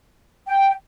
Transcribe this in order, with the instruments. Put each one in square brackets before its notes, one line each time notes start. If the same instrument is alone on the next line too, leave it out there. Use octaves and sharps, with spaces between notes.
[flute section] G5